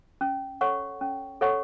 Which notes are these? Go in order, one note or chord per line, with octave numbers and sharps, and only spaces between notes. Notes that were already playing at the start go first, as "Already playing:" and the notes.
C#4
A4 C#5 F#5 C#6
C#4
A4 C#5 F#5 C#6